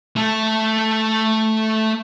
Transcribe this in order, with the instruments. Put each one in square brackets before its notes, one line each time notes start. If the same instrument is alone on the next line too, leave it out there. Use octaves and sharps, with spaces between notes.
[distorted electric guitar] A3 A4